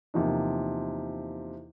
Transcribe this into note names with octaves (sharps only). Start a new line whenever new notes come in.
E2 C3 F3 A#3 D#4